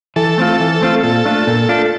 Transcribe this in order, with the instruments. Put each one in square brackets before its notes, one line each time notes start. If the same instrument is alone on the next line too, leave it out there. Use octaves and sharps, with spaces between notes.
[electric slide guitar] E3 [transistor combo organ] A4
[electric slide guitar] A3 C4 F4
E3
A3 C4 F4
[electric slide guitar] A#2 [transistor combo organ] A4
[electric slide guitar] A3 D4 F4
A#2
A3 D4 F4